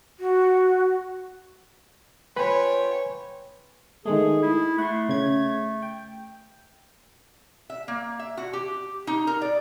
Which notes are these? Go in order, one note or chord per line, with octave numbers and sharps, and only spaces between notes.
F#4
F4 B4 C#5 G5 G#5 B5
D#3 G#3 A3 G#4
E4
A3 F#5 C6
C#3 G#6
G5
E5
A#3
E5
F#4
G4
D#4
A#4
D5